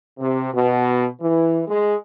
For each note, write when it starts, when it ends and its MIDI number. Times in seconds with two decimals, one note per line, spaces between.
0.18 0.50 48
0.53 1.04 47
1.21 1.60 52
1.67 1.95 56